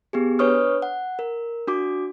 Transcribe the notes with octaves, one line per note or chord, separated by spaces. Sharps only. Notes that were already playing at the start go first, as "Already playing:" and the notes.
B3 G4 G#4
D4 B4 C#5 C#6 D#6 F6
F#5
A#4
D4 F#4 D6